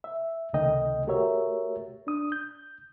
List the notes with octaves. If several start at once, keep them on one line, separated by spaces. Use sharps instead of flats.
E5
C#2 C3 D#3 A3 D#5 G5
A3 F#4 G4 A#4 C#5 E5
D4 D#6
G6